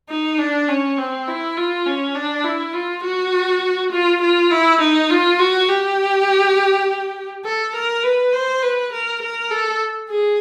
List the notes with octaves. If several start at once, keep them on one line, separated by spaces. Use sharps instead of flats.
D#4
D4
C#4
C4
E4
F4
C#4
D4
E4
F4
F#4
F4
F4
E4
D#4
F4
F#4
G4
A4
A#4
B4
C5
B4
A#4
A#4
A4
G#4